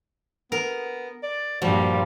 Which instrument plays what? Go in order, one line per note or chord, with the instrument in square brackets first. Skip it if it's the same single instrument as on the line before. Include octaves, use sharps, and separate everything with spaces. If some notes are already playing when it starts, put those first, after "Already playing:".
[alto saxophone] B3 [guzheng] A#4
[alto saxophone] D5
[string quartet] G2 A#2 G3 [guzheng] F3 [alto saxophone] F#4